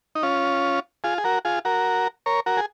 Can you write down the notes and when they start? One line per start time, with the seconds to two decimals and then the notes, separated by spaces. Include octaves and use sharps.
0.15 D#4
0.23 C#4 F4
1.04 F4 G#4
1.18 G#4
1.24 F#4 A#4
1.45 F4 G#4
1.65 F#4 A#4
2.26 A#4 C#5
2.46 F#4 A#4
2.57 G#4